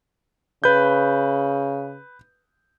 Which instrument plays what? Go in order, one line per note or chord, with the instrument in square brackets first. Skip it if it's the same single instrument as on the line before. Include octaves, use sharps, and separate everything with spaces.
[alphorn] C#3 [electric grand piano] B4 G6